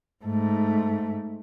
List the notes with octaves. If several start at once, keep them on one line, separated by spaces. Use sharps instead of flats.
G#2 A3